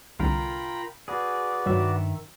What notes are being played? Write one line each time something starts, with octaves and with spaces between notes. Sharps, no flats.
C2 D3 F4 A#4 G5 A#5 B5
F#4 G#4 B4 D5
G2 D#3 F#3 E5